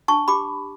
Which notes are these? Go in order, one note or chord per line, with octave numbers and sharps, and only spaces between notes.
D4 A5 C#6
G4 B5 D6